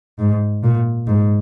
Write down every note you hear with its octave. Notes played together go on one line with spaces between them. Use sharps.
G#2
A#2
G#2